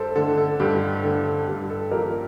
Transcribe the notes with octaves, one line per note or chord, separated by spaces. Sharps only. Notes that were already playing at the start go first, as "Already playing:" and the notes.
Already playing: G2 G4 A4 C5
D3 A3 A4
A4
G2 G4
D3 A3 A4
G2 G4
A4
F3 A#3 G4 A#4